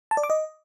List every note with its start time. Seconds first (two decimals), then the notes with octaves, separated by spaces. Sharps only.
0.11 A5
0.17 D5
0.23 D6
0.30 D#5